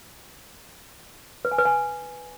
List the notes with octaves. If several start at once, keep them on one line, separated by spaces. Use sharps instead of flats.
B4
G#5
B4
G#5